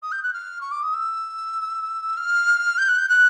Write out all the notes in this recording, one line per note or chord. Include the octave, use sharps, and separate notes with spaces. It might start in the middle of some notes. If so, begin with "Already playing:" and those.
D#6
G6
F#6
F6
C#6
D6
D#6
E6
F6
G6
F#6
G6
F#6